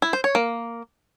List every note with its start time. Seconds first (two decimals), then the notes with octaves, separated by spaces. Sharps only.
0.02 E4
0.13 C5
0.24 C#5
0.35 A#3